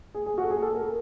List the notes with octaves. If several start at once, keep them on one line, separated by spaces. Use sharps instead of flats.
G#4
G#4
F#4
A4
G#4
A4
A#4